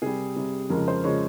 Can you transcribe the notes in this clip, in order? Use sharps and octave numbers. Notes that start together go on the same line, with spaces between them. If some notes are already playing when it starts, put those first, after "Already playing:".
C3 G3 G#4
C3 G3
F2 C#3 F3 G#3 A#4
C5
C#3 F3 G#3 C#5